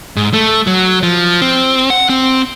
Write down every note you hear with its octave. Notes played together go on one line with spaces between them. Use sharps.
G#2
A3
F#3
F3
C4
F#5
C4